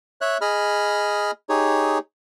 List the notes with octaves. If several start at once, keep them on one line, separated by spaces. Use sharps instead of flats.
C#5 E5 F#6
G#4 D#5 B5 F6
D#4 G4 G#4 C#5